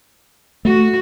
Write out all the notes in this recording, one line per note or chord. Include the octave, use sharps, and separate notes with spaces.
A3 F#4